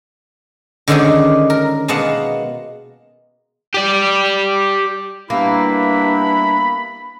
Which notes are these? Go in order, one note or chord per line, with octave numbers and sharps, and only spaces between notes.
D3 D#3 G#3 C#4 D#4 D5
A#4
B2 G#3 A#3 F#5 A5
G4 D5
G3 A#3 B3 D4 E4 B5